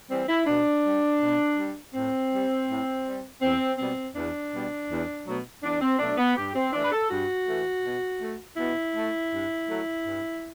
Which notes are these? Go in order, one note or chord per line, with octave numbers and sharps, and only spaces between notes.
E3 G3 C4
E4
B2 D4
G3
B2
G3
A2 C4
G3
A2
G3
E2 C4
B2 G3 C4
E2 D4
B2 G3
E2
B2 F#3 A3
E2 D4
C4
B2 F#3 A3 D4
B3
G2 G4
C4
E3 A3 D4
B4
A4
G2 F#4
E3 A3
B2
A3
B2 E4
A3
G2
F#3 A3
G2